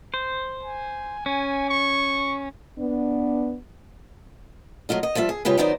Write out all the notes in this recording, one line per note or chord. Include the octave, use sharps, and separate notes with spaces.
C5
G#5
C#4 G#5
C#6
B3 D4
F#3 A3 F4 D#5
D#5
F3 G3 F4 E5
G#4
C#3 G#3 F4 G4 B4
D#3 F#3 B3 D#4 C5 D5